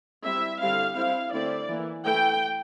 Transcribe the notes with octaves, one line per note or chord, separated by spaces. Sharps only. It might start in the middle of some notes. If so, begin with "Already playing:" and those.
G3 C4 E4 E5
D3 G3 C4 E4 F5
G3 C4 E4 F5
D3 A3 C4 E4 D5
E3 A#3 E4
E3 A3 E4 G5